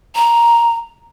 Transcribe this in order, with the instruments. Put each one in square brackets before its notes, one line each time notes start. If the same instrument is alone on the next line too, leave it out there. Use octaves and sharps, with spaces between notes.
[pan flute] A#5